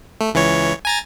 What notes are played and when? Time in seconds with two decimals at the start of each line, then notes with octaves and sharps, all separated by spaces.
0.21 A3
0.34 C#2 E3 C#5
0.85 G#5 A#5 A6